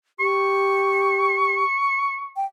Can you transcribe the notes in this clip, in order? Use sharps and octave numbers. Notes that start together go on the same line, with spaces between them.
G4 C#6
G5